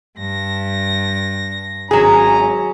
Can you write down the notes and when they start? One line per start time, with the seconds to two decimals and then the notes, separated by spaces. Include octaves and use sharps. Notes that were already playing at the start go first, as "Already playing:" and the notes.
0.18 G2 A#6
1.91 G#1 F#3 C#4 G#4 G#5 A#5